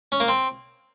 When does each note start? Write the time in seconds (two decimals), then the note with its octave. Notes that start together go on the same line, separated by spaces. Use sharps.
0.12 C#4
0.20 A#3
0.28 C4